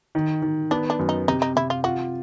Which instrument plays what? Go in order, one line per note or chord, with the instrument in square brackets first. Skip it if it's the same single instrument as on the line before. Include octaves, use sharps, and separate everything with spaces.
[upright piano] D#3
D#3
[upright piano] B3 [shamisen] D4
[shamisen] D4
[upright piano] F#2
[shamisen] D#4
[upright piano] C3 [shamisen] D#4
[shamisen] D#4
[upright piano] C3 [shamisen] E4
[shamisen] F4
[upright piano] F4 [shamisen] F#4